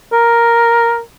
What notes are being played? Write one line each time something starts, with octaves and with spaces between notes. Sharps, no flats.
A#4